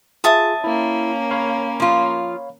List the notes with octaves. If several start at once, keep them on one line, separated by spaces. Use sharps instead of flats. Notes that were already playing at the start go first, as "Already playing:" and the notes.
F4 G#4 E5 A5 D#6
A#3 C#4 E4
C#5 F5 B5
F3 F4